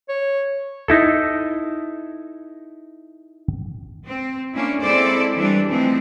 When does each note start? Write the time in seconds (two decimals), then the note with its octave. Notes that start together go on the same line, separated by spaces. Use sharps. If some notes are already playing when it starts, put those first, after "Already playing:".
0.09 C#5
0.88 D#4 E4 A4
4.06 C4
4.53 A#3 C#4 D4 E4
4.82 G#3 C4 E4 A4 C5 D5
5.37 E3 G3 D4
5.70 E3 F3 G#3 A3 C4